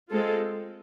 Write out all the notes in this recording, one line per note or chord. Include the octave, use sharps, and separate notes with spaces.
G#3 C4 F4 A4